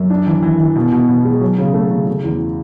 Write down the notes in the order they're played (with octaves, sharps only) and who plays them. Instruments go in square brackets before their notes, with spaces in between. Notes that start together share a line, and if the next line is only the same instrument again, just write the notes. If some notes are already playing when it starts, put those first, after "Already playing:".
Already playing: [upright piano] F#2
D4
E3
E3
E3
B2
B2
B2
G#3
F#3
C#3
A3
C#3
C#3
E2